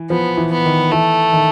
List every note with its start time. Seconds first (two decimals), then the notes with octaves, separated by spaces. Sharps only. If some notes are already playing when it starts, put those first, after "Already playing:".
Already playing: E3
0.10 F3 B3
0.37 E3
0.52 B3
0.65 D#3
0.92 E3 A3
1.33 D#3